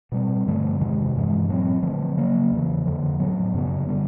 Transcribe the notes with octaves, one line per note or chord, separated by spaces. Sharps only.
B2 G3 C4
G2 D3 F3 A3
E2 C3 D#3 G#3
G2 E3 G#3
A#2 F#3 A3 C4
D3 F3 A3
C#3 F#3 A#3
E2 C#3 E3
F2 D3 F3
A2 F#3 B3
F#2 C#3 F#3 B3
D3 G3 B3